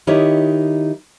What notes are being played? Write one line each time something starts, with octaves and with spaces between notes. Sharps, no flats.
D#3 D#4 E4 G4 C#5